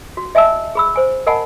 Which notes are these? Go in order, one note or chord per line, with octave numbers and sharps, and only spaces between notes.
F#4
D#5 E5 G#5 A5 E6
G#4 B5 E6
C5 G#5
A#4 D#5 F#5 G#5 A5 B5